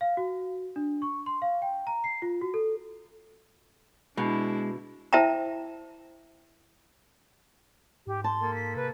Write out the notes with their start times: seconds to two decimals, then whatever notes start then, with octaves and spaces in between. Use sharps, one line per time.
0.01 F5
0.17 F#4
0.76 D4
1.02 C#6
1.26 C6
1.42 F5
1.62 G5
1.87 A#5
2.04 C7
2.22 F4
2.41 F#4
2.54 A4
4.17 B2 G#3 D4 E4
5.13 E4 C5 E5 G5 A5 A#5
8.07 G#2 G4
8.24 A5 C6
8.42 A#3 A4
8.55 B6
8.76 C3 B4